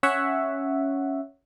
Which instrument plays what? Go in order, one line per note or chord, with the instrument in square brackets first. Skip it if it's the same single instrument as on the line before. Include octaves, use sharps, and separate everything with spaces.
[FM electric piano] C#4 C#5 E5 F#5